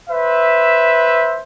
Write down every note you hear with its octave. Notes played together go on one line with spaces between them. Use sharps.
B4 C5 E5